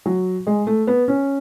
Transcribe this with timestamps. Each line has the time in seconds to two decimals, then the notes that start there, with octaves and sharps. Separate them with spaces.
0.06 F#3
0.47 G#3
0.67 A3
0.87 B3
1.08 C#4